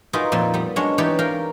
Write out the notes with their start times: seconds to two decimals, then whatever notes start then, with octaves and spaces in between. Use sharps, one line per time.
0.13 D#4 F4 F#4 G#4 A#4 B4
0.32 F2 A#2 F3 D5 C6
0.54 G3 B3
0.76 F#3 G#3 C#4 D4 C#5
0.98 E3 D#4 G4 B4 C#5 D5
1.19 A#4 F5 G5 G#5